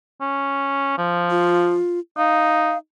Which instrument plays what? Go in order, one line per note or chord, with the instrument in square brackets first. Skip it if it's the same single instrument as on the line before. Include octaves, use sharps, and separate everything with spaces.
[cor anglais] C#4
F3
[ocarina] F4
[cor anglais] D#4 [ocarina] F5